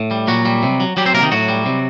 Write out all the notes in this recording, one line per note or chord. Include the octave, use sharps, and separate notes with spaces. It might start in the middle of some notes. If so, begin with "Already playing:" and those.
Already playing: A2
G3
A#2 F#3 F#4
G3
C3
F#3
F#3 G3 G4
C4 C5
C3 A#3 A#4
D#3 D#4
A2 F#3 F#4
G3
C3